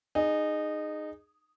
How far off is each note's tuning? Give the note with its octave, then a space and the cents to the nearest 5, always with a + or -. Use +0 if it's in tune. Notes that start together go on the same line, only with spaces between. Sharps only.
D#4 -20 G#4 +0